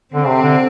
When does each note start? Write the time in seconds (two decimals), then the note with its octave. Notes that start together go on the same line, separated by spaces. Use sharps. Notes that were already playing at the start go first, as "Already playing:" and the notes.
0.14 D3 C4
0.28 C3
0.42 D3